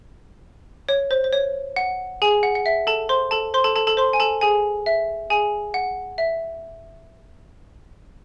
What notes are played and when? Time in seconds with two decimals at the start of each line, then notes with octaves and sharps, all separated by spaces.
0.89 C#5
1.11 C5
1.24 C5
1.33 C#5
1.76 F#5
2.22 G#4 G#5
2.43 F#5
2.55 F#5
2.66 E5
2.87 A4 A5
3.09 C5 C6
3.31 A4 A5
3.54 C5 C6
3.64 A4 A5
3.76 A4 A5
3.87 A4 A5
3.97 C5 C6
4.13 G#5
4.20 A4 A5
4.41 G#4 G#5
4.86 E5
5.30 G#4 G#5
5.74 F#5
6.18 E5